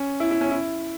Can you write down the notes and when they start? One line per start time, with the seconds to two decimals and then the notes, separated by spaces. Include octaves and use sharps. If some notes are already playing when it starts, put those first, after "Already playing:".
Already playing: C#4
0.20 E4
0.31 E4
0.41 C#4
0.51 E4